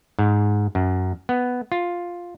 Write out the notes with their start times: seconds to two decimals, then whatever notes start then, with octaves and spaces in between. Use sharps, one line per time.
0.19 G#2
0.75 F#2
1.29 B3
1.72 F4